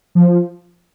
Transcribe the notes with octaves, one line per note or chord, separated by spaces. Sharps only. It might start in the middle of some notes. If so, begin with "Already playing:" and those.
F3